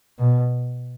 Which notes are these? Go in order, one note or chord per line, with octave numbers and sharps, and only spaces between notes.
B2